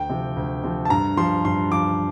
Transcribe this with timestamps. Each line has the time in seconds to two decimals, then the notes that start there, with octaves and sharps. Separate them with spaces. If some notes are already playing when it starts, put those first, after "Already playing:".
Already playing: D2 G5
0.10 C3 F3
0.36 D2
0.64 C3 F3
0.85 A5
0.90 G2 A#5
1.17 F3 C6
1.45 G2 C6
1.71 F3 D6